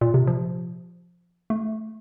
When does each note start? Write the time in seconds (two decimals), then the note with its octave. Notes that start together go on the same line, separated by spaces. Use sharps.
0.01 A#2
0.14 C3
0.27 F3
1.50 A3